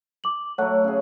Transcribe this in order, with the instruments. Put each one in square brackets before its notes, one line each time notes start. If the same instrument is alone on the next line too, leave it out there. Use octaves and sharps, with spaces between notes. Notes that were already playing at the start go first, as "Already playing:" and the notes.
[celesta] D6 F#7
[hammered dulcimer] F#3 A3 [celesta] C#5 F#5 F#6
[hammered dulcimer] C#3 G#4